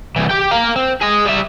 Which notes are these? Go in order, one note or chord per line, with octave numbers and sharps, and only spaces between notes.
C2 E3
G4 G5
A#4 F5
C4
G#4 D#5
G3 E5